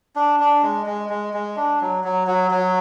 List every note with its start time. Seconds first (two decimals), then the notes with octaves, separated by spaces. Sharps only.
0.16 D4
0.40 D4
0.63 G#3
0.86 G#3
1.09 G#3
1.33 G#3
1.57 D4
1.81 F#3
2.04 F#3
2.27 F#3
2.51 F#3